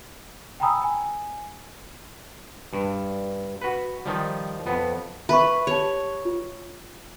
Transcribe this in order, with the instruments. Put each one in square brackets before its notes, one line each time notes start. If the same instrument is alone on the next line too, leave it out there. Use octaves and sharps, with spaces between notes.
[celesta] G5 G#5 A#5 B5 D#6 E6
G#5
[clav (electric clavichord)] G2
F#4 B4
D#3 F3 G3
F2 B3
[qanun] B4 [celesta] E5 C#6
[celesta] G4 A5 [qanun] C#5
[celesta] F4